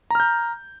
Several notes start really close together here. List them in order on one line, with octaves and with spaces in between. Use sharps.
A#5 F6 G6